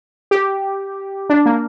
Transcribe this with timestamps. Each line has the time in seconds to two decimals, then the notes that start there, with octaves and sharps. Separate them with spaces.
0.31 G4
1.30 D4
1.46 A#3